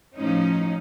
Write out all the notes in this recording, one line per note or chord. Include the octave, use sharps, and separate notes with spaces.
A2 F3 C#4 D#4